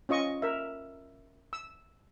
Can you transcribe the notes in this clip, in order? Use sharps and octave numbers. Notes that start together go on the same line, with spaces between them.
C#4 F4 D#5 C#6
A#4 E5
E6